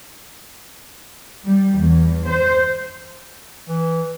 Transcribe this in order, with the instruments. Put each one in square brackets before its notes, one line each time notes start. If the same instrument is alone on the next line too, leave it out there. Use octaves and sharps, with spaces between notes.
[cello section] G3
E2
C5
[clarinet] E3